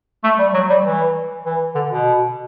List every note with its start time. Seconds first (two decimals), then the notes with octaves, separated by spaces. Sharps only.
0.24 A3
0.39 G3
0.54 F#3
0.69 G3
0.84 E3
1.45 E3
1.75 D3
1.90 B2